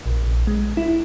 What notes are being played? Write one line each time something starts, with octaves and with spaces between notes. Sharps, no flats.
A#1
G#3
E4